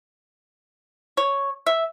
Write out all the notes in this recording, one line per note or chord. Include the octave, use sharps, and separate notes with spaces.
C#5
E5